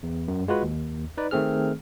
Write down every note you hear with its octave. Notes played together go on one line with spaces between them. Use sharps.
E2
F#2
G#3 F4 F#4 B4
D#2
D#4 B4 D5
D#3 A3 C4 G#4 F6